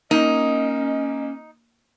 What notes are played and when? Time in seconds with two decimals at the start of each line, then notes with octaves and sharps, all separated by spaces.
0.11 A#3 C#4 D#4 D#5